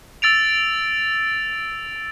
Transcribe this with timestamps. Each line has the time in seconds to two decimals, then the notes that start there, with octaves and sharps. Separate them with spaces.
0.22 E6 A6 D7 F7